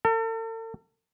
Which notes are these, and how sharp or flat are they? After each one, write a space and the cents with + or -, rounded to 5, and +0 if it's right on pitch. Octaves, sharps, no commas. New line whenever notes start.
A4 +45